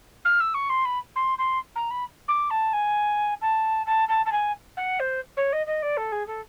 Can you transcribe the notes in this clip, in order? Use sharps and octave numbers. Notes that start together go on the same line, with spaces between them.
F6
E6
C#6
C6
B5
C6
C6
A#5
B5
D6
A5
G#5
A5
A5
A5
A5
G#5
F#5
C5
C#5
D#5
D#5
D5
A4
G#4
A4